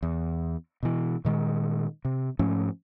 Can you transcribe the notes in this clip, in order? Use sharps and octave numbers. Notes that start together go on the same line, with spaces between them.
E2
B2 E3
A#2 D#3 G#3
C3
G#2 F3 A3 C#4